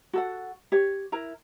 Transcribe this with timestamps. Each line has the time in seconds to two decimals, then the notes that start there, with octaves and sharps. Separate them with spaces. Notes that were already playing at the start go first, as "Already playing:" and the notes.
0.13 F#4 A4 F#5
0.72 G4 C#5
1.12 E4 A#4 A#5